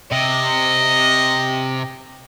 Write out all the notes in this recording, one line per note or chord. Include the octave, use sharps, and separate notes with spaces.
C3 D#5